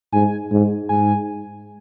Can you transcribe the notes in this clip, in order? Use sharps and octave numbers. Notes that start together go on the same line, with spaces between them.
G#2 G#5
G#2
G#2 G#5